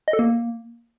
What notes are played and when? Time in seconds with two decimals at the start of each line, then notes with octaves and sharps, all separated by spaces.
0.08 D#5
0.13 A4
0.19 A#3